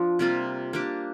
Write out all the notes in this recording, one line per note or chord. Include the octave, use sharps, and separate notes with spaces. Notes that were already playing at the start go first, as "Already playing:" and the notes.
Already playing: F3 D4
C3 G3 A#3 F4
A#3 D4 G4